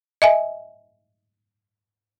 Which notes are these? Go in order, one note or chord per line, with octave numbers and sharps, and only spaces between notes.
D#5 E5 G#5